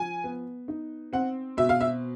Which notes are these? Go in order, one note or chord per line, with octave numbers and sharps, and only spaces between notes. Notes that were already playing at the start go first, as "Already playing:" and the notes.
Already playing: F3 G#5
B3
D#4
C4 F#5
B2 E5
F5
E5